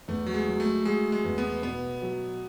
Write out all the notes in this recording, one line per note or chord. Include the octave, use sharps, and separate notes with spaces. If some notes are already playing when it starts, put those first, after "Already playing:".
E2 A3
F#3
G#3
F#3
A3
F#3 G#3
G#3
E2
B3
B2 B3
F#3